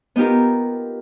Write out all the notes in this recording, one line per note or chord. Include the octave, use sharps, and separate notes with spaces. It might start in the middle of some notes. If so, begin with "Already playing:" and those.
B3 D#4 F4 G4 A#4